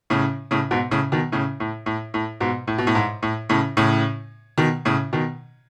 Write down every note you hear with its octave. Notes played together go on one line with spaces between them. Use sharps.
A2 C#3
A2 C#3
G#2 B2
A2 C#3
B2 D#3
A2 C#3
A2
A2
A2
G#2 B2
A2
B2
A2
G#2
A2
A2 C#3
A2 C#3
B2 D#3
A2 C#3
B2 D#3